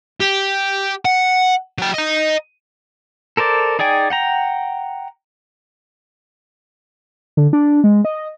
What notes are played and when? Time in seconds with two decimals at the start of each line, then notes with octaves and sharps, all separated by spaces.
0.20 G4
1.05 F#5
1.78 F#3 G5
1.94 D#5 A#5
3.37 A4 A#4 C5 D5
3.79 D#4 G#4 D5 G5 G#5
4.10 F#5 G5 A#5
7.37 D3
7.53 D4
7.84 G#3
8.05 D#5